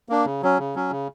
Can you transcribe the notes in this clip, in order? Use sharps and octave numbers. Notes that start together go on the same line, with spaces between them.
A#3 D4
C#3
F#3 C#4
C#3
F#3 C#4
C#3